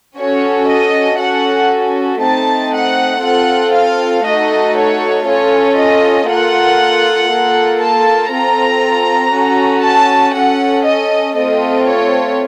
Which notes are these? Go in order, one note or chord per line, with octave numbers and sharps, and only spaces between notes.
C#4 F#4 A4 C#5
D#5
C#4 F#4 A4 F#5
A3 C4 D#4 A5
F#5
C4 F4 A4 F#5
F5
A3 D#4 F#4 A4 D#5
C#5
C#4 F4 A4 C#5
D#5
A#3 F4 A4 F#5
A#3 F4 A4
A5
C4 F4 A4 A#5
C#4 F#4 A4
A5
C#4 A4 F#5
D#5
A3 C4 F4 A4 D#5
C#5